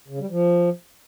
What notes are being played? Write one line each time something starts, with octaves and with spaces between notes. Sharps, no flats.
C#3
G3
F3